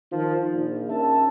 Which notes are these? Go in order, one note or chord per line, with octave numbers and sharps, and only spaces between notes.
D#3 F3
A#1
C#4 D#4 A#4 E5 A5